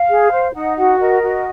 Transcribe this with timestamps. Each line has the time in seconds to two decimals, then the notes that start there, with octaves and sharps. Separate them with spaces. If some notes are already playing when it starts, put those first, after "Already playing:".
Already playing: F5
0.10 G#4
0.31 C5
0.54 D#4 F#5
0.77 F#4 F#5
0.99 A#4 D#5
1.21 F#4